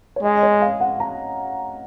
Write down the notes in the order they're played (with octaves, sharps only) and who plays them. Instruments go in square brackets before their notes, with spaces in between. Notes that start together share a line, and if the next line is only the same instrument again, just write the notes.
[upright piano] C#5
[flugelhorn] G#3 [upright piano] D#5
[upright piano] D#5
C#5
F5
F#5
A#5